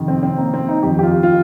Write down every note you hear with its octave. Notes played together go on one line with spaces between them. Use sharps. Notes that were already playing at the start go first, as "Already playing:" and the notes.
Already playing: F2 C3 D#3
C4
C4
A#3
C4
D#4
F2 D#3 G4
G4
F4
F4